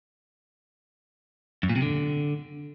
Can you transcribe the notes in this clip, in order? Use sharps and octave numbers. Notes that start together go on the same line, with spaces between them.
F#2
A#2
C3
D3